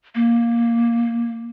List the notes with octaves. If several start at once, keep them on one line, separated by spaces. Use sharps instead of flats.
A#3